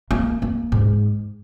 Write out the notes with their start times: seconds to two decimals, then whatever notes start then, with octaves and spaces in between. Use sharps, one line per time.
0.11 A#3
0.42 A#3
0.72 G#2